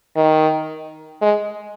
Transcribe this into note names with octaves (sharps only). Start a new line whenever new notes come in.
D#3
G#3